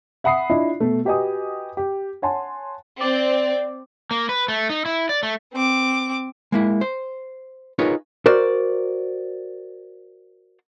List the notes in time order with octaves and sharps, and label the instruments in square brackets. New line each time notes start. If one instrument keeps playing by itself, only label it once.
[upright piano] E5 F#5 B5 D#6 C7
D4 E4 F4 D#5 E5
B2 A3
F#4 G4 B4 D#5 G#5 D#6
G4
C#5 F#5 G#5 A5 C6
[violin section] C4 [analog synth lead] D5
[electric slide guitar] A#3
B4
A3
D#4
E4
D5
A3
[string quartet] C4 D6
[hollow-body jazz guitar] G#3 A#3 E4
C5
D#4 F4 G#4 A#4 B4 C#5
F#4 A#4 C5 D5